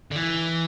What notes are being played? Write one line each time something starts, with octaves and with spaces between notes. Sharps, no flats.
D3
E3